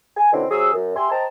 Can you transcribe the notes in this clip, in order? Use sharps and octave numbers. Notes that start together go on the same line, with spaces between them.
G#5
B2 D3 C4 C#4 D#4 E4
C3 F#3 G#4 D#6 E6
F#2
G4 E5 G#5 C6
C5 D#5 G5 A5 A#5